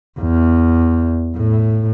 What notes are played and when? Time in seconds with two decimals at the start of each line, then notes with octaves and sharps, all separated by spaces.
0.19 E2
1.37 A2